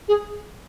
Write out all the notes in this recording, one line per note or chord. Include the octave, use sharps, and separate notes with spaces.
G#4